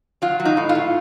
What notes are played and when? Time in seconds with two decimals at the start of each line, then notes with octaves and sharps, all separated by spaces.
0.22 F#3 F4
0.40 F#3
0.45 D#4
0.57 A2
0.69 F4
0.75 A2